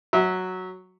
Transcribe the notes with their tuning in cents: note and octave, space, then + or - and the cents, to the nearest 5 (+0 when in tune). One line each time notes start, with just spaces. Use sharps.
F#3 +0 E5 -30